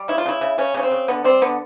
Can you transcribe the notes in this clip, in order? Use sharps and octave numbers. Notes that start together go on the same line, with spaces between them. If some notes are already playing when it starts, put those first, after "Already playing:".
Already playing: G3
C#3 E4
F4
C#3 E4
C#3
C#3 C#4
C#3 C#4
C4
C#3
D3 B3
G3 C4
D3 B3